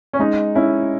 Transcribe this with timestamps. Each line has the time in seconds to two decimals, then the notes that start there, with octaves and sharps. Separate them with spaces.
0.13 C#4
0.19 G#3 D#4
0.55 C#4 E4